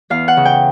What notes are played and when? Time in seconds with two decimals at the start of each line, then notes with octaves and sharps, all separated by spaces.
0.10 E2 F5
0.28 F#5
0.37 C#3
0.45 G5